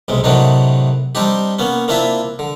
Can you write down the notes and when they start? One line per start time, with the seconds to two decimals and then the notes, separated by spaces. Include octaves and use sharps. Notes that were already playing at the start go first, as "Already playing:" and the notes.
0.08 B1 C3 G#3
0.24 A2 C3 D#3 F#3 D4 D#4
1.15 G3 C4 D4 D#4 G4
1.59 A#3 B3 C#4
1.88 A#3 C4 D4 E4 F4 E5
2.39 D3